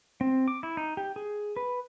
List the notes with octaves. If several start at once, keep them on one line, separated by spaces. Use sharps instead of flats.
C4
D6
E4
D#4
G4
G#4
B4